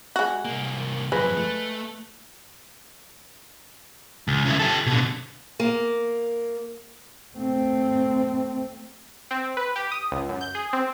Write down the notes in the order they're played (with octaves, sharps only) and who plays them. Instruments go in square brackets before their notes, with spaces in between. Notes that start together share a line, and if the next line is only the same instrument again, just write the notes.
[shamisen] G#3 F#4
[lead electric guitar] C2 A#3
[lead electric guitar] F#2 F3 [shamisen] G#3 [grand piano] B4
[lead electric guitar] A3
C#2
C#3 E4
G4 A4
B2 D3
[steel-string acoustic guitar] A#3
[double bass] A3 C4
[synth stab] C4
B4
G4
D#6
C#2
F#2
G6
G#4
C4